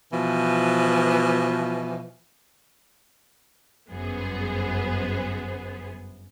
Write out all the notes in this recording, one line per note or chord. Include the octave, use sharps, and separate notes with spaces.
B2 E3 F3
G1 F#2 B3 G#4 C5